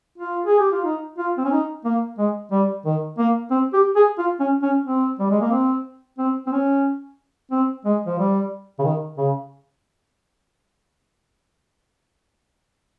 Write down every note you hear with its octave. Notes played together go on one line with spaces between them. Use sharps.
F4
G#4
G4
F4
D#4
F4
C4
C#4
D#4
A#3
G#3
G3
D#3
A#3
C4
G4
G#4
F4
C#4
C#4
C4
G3
G#3
A#3
C4
C4
C4
C#4
C4
G#3
F3
G3
C#3
D#3
C#3